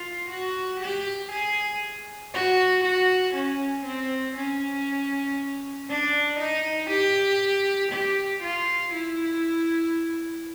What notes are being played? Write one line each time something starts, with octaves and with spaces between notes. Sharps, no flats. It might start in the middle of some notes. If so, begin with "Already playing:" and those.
Already playing: F4
F#4
G4
G#4
F#4
F#4
C#4
C4
C#4
D4
D#4
G4
G4
F4
E4